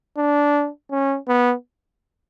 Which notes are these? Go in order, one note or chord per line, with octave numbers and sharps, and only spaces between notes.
D4
C#4
B3